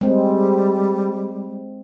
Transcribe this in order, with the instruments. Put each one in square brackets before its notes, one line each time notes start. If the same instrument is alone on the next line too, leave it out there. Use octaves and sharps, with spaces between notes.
[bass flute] G3 [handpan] G#3 C4